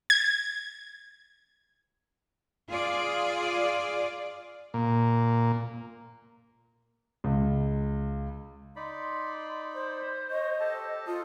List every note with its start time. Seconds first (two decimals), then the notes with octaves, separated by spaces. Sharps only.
0.10 G#6
2.68 F4 G#4 D5
4.74 A#2
7.24 C#2
8.76 D#4 D5 B5 C6
9.74 C5
10.30 C#5 D#5
10.60 G4 A4 A5
11.07 F4 A4 D#5